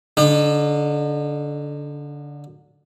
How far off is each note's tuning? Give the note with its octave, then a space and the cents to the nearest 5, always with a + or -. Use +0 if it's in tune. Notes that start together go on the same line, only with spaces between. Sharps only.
D3 -20 D#4 -45 D#5 -45